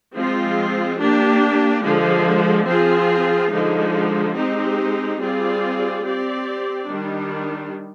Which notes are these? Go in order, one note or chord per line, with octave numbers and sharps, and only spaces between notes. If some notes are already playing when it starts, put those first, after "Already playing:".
F3 G#3 C4 F4
A#3 D4 G4
D3 F3 G#3
F3 C4 F4 G#4
D3 F3 G#3 D#4
G#3 C4 D#4 G4
G3 C4 F4 G#4 D5
C4 G4 D5
D#3 G3 D4